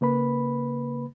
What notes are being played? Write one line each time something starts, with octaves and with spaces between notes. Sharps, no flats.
C#3 A#3 B4 B5